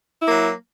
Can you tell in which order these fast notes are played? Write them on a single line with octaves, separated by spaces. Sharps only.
E4 A#3 F#3